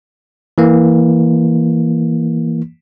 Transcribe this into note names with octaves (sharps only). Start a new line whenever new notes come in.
E3 A#3